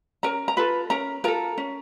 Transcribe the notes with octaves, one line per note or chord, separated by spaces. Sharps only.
C#4 A#4 A#5
A#5
F4 A4 B4 B5
C#4 A#4 A#5
F4 A4 A#4 A#5
C#4